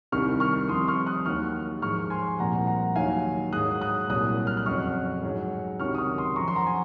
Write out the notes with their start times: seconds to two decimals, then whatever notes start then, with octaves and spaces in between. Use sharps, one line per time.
0.12 C2 C3 D#3 C#6 F6
0.40 C#6 F6
0.68 C2 C3 F3 C6 D#6
0.88 C#6 F6
1.07 D#6 F#6
1.26 D#2 D#3 F#3 C#6 F6
1.82 G#2 F3 C#6 F6
2.10 G#5 C6
2.39 C2 A#2 F3 F#5 A#5
2.67 F#5 A#5
2.96 D#2 D#3 F#3 F5 G#5
3.53 G#2 F#3 D#6 F#6
3.81 D#6 F#6
4.10 C2 A#2 F#3 D#6 F#6
4.47 F6
4.57 F#6
4.66 F2 C#3 F#3 C#6 F6
5.23 G#2 F#3
5.80 C#2 C3 D#3 F#3 C#6 F6
5.95 D#6
5.98 C#6 F6
6.18 C6 D#6
6.36 F#2 F3 A#5 C#6
6.48 C6
6.55 F#5 A#5
6.67 G#5